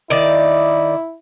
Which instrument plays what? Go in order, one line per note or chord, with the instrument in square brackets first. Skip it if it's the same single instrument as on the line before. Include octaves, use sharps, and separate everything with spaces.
[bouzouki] D#3 D5 [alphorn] E4